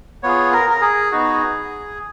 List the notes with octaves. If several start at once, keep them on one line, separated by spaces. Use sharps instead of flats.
B3 F4 G#4 C#5
A#4
A#4
G#4
B3 D#4 F#4